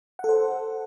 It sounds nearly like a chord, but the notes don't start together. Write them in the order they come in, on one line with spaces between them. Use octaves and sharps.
F#5 A4 C5